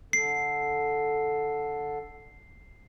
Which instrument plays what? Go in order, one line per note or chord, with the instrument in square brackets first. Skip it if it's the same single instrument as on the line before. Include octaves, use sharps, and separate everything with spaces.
[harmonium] D3 A4 [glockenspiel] C7